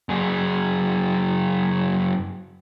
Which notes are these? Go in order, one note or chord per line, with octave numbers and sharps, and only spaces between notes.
F#2 G#4